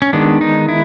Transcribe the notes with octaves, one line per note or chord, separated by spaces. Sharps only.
C#4
D#3 G#3 B3 D4
D#4
E4